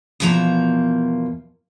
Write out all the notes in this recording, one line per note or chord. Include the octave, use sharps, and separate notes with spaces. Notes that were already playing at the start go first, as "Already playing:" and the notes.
E2 B2 F3 A#3 A5 A#5